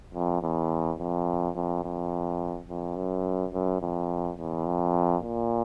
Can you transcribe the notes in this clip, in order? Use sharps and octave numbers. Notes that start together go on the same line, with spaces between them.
F2
E2
F2
F2
F2
F2
F#2
F#2
F2
E2
F2
A#2